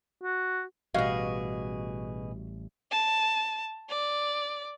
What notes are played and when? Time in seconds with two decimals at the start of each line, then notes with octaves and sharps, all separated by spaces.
0.23 F#4
0.94 A1 B2 G3 F#4 G#4 D#5 F5
2.91 A5
3.90 D5